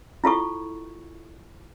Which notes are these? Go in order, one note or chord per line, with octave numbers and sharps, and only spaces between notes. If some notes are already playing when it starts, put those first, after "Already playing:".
E4 F4 A4 C#6